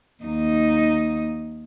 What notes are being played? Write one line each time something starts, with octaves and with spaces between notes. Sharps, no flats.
D#2 D#4